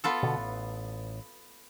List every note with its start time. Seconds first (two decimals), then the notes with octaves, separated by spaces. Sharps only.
0.04 B3 F4 A4
0.23 B2 D3
0.36 A1